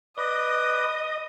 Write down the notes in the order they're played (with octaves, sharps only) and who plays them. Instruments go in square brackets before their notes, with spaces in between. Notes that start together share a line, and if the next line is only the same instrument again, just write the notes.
[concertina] B4 [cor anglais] D5 [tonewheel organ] D#5 [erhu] D#6